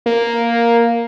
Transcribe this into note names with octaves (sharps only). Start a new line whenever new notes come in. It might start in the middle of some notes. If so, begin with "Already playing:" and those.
A#3